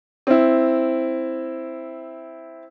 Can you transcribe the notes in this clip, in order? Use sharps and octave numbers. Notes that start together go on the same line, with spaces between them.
C4 E4